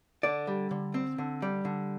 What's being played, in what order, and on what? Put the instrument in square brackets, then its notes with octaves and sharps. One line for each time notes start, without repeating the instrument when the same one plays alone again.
[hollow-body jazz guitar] D3 D5
G3
D3
C4
D3
G3
D3